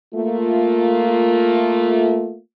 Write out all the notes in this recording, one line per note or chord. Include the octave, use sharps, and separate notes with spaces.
A3 A#3 F4